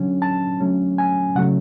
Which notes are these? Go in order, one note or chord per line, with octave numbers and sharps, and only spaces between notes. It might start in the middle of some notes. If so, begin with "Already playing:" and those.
Already playing: D3 F#3 C#4
A5
D3 F#3 A3 C#4
G#5
C#3 F#3 A3 C#4 F#5